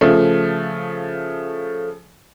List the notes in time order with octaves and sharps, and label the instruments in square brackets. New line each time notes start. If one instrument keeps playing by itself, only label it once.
[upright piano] C#3 F3 A3